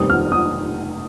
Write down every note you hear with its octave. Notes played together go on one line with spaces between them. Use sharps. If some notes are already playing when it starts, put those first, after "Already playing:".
Already playing: F1 D#2 D#3 G3 C4 D#6
F6
D#6